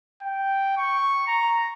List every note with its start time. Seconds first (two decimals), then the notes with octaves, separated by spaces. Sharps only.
0.22 G5
0.77 C#6
1.27 A#5